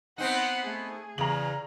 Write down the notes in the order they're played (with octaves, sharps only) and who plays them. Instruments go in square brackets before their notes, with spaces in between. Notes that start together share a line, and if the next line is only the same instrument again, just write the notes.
[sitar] B3 C4 D#4 [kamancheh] F#5 B5
[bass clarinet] A3 [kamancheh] G#4
[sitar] E2 [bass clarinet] C#3 [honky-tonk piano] A#5 F#7